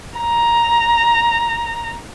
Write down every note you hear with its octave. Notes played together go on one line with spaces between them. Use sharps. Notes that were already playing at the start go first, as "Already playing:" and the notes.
A#5